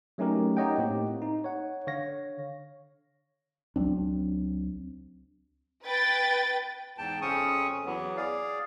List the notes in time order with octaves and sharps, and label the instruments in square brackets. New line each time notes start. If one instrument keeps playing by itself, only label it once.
[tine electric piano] F#3 A3 C#4 D#4 G4 A#4
D#4 G4 C#5 D#5 F#5 G5
A2 A#3 C4 G4
D#4
C#5 F#5
D3 C#5 F5 A#6
[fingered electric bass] C#2 F#3 C4 D4
[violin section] B4 G5 A6
[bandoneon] E2 G#2 G5 A5
F2 C#3 C4 C#4 C#6 D#6
E2 E3 F#3 B3
G#4 D5 F5